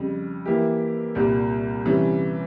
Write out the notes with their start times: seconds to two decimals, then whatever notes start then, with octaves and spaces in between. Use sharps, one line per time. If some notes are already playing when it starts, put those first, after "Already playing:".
Already playing: F2 C#3 G3
0.46 E3 A#3 E4 G4
1.15 C2 A#2 G3
1.85 C3 E3 G3 C#4